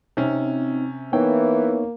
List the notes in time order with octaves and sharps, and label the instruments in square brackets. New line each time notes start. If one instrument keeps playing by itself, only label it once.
[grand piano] C3 C#4 [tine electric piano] C4 D#4
[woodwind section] E3 [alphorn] A#3 [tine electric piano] B3 D#4 C#5 [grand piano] G5